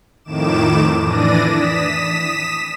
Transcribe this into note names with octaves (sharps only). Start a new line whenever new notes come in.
F2 A2 D#3 D6 E7
E3 D4 D5 A#6 D#7
D#6 B6 E7